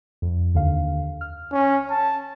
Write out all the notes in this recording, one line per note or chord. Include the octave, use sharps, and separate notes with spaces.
F2
D#2 D3 F5
F6
C#4
A5